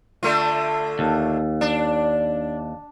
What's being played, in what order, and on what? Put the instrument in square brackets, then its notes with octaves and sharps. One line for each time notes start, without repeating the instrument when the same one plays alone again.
[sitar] D3 A3 F4
[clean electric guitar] D#2
[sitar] D4